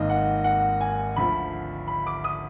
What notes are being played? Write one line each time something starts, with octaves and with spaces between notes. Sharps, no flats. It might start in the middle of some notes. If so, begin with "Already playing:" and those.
Already playing: G#1 G#2 D#3 A#3 D#5
F#5
F#5
G#5
D2 D3 F3 B5
B5
D6
D#6